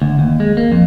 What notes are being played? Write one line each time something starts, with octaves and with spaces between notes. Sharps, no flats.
D2
D#2
G#3
A#3
F2